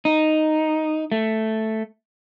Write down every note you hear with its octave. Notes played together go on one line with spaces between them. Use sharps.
D#4
A3